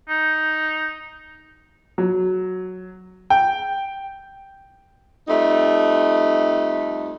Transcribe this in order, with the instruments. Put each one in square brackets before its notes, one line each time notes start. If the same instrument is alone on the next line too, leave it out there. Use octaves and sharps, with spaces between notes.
[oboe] D#4
[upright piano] F#3
G5
[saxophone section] F2 G3 A3 D#4